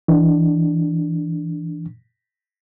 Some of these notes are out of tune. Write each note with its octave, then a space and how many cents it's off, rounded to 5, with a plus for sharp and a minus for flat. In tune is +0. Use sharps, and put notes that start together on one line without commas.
E3 +0 D4 +0